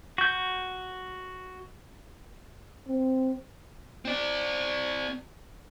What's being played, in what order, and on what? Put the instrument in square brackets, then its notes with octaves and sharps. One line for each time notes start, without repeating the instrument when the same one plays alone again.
[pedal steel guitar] F#4 G6
[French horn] C4
[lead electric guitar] C4 D5